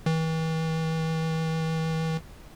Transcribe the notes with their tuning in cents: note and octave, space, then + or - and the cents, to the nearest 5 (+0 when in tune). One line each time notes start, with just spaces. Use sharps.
E3 -40